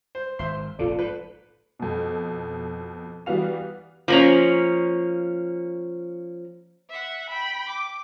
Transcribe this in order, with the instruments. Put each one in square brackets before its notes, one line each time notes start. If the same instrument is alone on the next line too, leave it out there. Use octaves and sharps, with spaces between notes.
[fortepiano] C5
[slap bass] G#1 [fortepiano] C5 E5 C6
[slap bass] F1 A#1 C#3 [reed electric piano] F4 A4 D5
[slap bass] G#2 [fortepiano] B4
[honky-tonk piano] F2 B2
E3 G3 B3 F#4 F5 F7
[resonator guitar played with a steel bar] F3 A#3 C#4
[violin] E5 F#5
G5 B5
D6